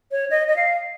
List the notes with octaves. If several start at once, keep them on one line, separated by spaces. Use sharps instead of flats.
C#5
D#5
D#5
F5